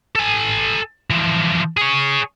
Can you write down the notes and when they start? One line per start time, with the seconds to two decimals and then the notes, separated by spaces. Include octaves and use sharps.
0.16 A4 G#5
1.10 E3 F3
1.77 G#4 C#5